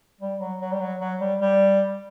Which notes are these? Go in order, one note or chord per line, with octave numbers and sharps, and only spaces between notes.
G3
F#3
F#3
G3
F#3
F#3
G3
G3